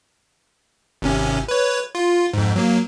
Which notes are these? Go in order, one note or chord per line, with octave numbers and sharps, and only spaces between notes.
G#1 C3 C#4
B4 C#5
F4
F2 G#2
F#3 A#3